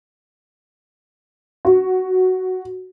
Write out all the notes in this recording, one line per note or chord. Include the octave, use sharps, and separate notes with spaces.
F#4